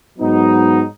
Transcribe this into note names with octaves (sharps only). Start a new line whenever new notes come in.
G#2 F#3 B3 D#4